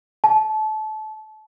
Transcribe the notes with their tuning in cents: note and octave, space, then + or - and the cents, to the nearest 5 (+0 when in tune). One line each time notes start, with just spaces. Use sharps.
A5 -25